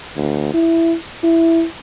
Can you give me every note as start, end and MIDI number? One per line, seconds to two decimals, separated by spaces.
0.17 0.49 38
0.54 0.96 64
1.24 1.65 64